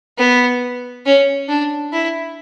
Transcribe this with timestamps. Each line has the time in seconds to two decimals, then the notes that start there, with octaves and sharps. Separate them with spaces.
0.18 B3
1.06 C#4
1.49 D4
1.93 E4